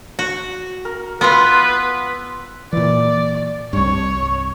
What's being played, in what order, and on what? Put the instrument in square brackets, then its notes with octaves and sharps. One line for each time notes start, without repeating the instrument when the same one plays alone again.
[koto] F#4
[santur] A#4
[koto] B3 F4 [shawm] B4 [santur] B5 C6 E6
[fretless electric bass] A#2 E3 [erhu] D5
[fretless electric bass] C2 G2 [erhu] C#5